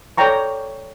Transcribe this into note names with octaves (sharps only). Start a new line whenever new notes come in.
A4 C#5 D5 G5 A#5 C#6